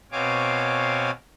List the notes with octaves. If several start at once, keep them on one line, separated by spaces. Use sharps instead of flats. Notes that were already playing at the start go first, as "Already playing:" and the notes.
B2 C4 C#5 F5 G#5 D6